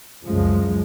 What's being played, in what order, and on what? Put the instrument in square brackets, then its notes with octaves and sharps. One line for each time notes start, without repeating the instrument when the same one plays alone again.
[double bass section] C#2 F#2 C#3 F3 G#3